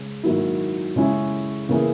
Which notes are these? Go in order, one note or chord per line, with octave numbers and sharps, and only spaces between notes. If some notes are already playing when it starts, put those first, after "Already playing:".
Already playing: C#3 G#3
G#2 D#3 F#3 A#3 E4
C#3 G#3 C#4 E4
C#3 E3 A#3 E4 G#4